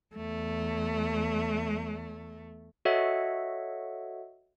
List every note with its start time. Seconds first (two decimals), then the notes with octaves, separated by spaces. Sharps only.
0.15 E2 A3
2.85 F#4 A4 C#5 D#5 E5 F#5